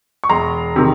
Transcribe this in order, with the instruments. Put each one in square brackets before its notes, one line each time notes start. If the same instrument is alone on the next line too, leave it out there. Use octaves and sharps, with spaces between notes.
[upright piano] C#6
E1 A#5 C6
C3 D#3